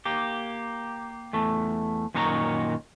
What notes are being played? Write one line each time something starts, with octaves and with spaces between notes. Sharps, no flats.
A#3 G4
E2 A3
F#2 A#2 D#3 F#4 C#5 A#5